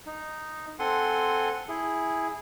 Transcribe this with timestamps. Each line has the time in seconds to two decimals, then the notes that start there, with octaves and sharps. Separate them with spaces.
0.06 D#4
0.79 C4 A4 F#5 G#5 C6
1.69 E4 G#4